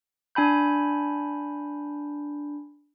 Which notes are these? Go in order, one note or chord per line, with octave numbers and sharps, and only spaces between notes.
D4 G#5 B5 G6